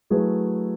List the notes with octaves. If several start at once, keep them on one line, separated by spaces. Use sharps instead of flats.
F#3 A3 E4 G#4 B4